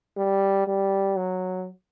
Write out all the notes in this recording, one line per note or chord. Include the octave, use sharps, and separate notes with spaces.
G3
G3
F#3